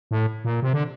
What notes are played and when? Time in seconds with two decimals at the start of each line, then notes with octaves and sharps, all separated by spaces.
0.11 A2
0.45 A#2
0.62 C3
0.73 D3